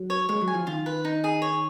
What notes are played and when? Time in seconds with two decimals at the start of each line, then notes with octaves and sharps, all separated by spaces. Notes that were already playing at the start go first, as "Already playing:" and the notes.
Already playing: F#3
0.10 C#5
0.29 G#3 C#5
0.41 F#3
0.48 G#5
0.54 F3
0.67 D#3 F4
0.86 B4
1.05 D#4
1.24 G#4
1.42 C#5